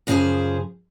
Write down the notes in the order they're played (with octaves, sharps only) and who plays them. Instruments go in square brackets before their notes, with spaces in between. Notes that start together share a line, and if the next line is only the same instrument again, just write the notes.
[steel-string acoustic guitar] F#2 C#3 F3 D4 G#4 C5